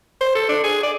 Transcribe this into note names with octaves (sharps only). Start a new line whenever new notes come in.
C5
A4
D4
G#4
D5